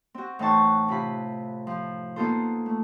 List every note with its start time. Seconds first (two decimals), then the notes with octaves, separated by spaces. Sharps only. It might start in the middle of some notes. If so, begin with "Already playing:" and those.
0.15 C4 F#4
0.39 A2 E3 D#4 C5 A5 C#6
0.88 C3 F4 B5
1.67 F3
2.16 A#3 B3 D#4 F4 A4 C5
2.66 A3